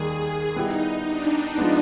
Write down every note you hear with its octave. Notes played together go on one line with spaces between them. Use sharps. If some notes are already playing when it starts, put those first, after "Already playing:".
Already playing: D#2 D#3 G3 G#4
G3 B3 D#4 E4 G4
D4
F3 G#3 B3 D4